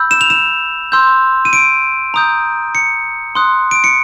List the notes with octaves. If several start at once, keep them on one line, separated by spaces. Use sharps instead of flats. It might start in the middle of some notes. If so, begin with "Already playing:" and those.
Already playing: B5 E6 G6
E7
F7
E7
C6 E6 G6
D#7
D7
A#5 D#6 G6
C#7
C6 D#6 F#6
D7
C#7